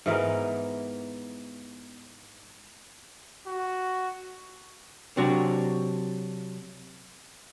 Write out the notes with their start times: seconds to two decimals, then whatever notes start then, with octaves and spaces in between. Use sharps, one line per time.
0.06 G#2 E3 B3 A#4
3.47 F#4
5.17 C3 F#3 D4 F#4